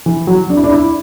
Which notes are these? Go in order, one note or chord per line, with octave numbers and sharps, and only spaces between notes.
E3
F#3
D4
E4
D4
E4